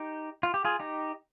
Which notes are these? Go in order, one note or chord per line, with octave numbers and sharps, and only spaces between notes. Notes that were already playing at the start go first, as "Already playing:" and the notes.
Already playing: D#4 G4
F4
G4
F4 G#4
D#4 G4